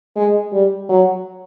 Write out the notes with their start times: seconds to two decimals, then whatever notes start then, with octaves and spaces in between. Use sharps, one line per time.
0.16 G#3
0.53 G3
0.89 F#3